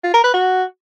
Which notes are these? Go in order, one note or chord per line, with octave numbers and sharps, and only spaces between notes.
F4
A#4
B4
F#4